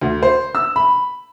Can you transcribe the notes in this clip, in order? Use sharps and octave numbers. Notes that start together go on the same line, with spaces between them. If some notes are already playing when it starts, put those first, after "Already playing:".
D2
C5
E6
B5